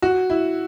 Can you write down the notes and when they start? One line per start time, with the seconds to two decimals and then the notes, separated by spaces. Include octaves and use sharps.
0.02 F#4
0.30 E4